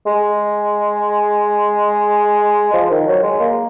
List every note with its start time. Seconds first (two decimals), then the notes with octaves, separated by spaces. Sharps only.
0.07 G#3
2.73 F3
2.91 D#3
3.07 F#3
3.23 G#3
3.40 A#3